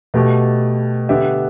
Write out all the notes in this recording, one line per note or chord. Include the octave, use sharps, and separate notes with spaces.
B2 A3 G4
D3 B3 G4 E5